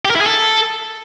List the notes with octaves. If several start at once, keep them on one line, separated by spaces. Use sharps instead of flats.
G4
A#4
E4
G#4
A4